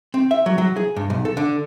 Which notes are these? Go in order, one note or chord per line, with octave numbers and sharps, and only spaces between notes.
C4
E5
F#3
F#3
G#4
G2
B1
A4
D3